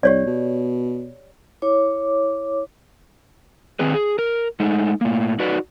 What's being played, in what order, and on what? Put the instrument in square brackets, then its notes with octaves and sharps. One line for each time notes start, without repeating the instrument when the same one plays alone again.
[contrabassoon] C2 [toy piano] G4 C#5 D5
[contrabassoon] B2
[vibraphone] E4 C#5 D6
[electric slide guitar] D#3 C4 G#4 B4
G#4
A#4
G#3 A3 D#4
A2 A#3
D#4 F#4 B4 D5